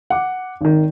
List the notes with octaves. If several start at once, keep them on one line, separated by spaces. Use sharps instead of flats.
F#5 D6
G#1 D#3